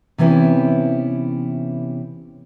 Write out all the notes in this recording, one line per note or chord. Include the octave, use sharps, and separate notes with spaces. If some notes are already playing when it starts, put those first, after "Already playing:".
C3 E3 B3 C#4 E4 G4